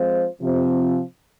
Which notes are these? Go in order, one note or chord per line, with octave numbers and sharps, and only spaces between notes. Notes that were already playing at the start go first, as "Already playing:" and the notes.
Already playing: F3 G#3 C4 F4 C5
C3 F3 C4